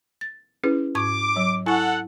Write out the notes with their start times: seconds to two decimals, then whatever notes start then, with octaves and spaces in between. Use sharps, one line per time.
0.21 A6
0.64 C#4 E4 G#4 B4
0.95 G#2 C#6 D6 G#6
1.36 F#3 C#5
1.66 E4 A4 F#5 G#5 C#6